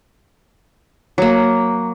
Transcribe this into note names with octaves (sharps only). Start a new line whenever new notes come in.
F#3 A#3